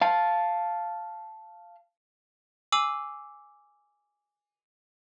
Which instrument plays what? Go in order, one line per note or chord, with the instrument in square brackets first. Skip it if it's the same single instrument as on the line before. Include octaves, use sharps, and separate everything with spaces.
[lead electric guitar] F5 A5
[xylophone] G#5 D6 E6 C7 F#7